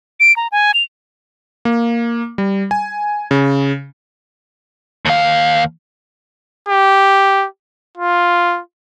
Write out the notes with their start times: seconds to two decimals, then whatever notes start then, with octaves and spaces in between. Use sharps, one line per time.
0.20 D7
0.37 A#5
0.52 G#5
0.74 F7
1.65 A#3
2.38 G3
2.71 G#5
3.31 C#3
5.06 D#2 F5
6.68 G4
7.98 F4